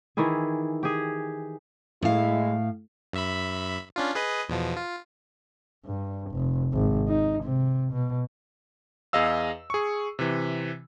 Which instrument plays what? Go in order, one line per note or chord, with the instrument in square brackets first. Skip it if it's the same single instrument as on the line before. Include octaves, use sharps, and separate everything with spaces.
[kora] D#3 E3 E4 G#4
G4 G#4
[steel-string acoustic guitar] A2 F5 [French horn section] G#3 E4
[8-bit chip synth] F#2 E5 B5
C#4 D4 F4
G#4 B4 D#5
E2 B2 F3
F4
[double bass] G2
F1
G#1
D#4
C3
B2
[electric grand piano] E2 G#4 D#5 F5 E6
G#4 C#6
C3 E3